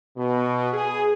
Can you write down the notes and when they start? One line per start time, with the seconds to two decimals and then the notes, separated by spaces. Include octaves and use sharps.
0.17 B2
0.73 G#4